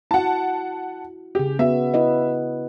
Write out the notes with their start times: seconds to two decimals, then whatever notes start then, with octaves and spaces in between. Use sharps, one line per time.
0.11 E4 F#4 F#5 A5
1.35 C#3 G4 G#4
1.59 B3 F#4 E5
1.94 E4 B4 D#5